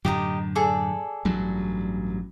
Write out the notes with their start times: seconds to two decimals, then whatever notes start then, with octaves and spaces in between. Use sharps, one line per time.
0.05 F#2 A2 D3 G4 D#5 A#5
0.55 G#4 A4 D5
1.25 A1 G2 F#3